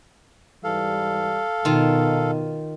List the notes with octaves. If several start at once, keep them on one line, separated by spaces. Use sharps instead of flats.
G#2 E3 G3 A4 F5
B2 D#3 D#4 F4